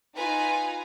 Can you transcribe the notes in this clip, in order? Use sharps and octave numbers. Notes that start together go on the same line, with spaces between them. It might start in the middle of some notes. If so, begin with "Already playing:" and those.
D#4 F4 B4 G#5 A#5